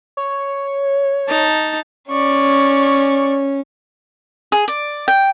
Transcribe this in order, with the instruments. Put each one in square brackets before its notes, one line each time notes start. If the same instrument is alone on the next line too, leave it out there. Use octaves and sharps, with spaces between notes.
[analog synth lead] C#5
[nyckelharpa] D#4 A5
[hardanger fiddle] C#4 [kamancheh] D5 C#6
[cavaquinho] G#4
D5
G5